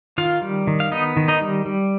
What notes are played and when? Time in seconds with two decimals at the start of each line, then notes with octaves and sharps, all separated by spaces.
0.18 D#3 F4 F5
0.42 G3
0.67 D#3
0.80 F5
0.92 B3 D#4 D#5
1.17 D#3
1.28 D#4 D#5
1.41 G3
1.66 G3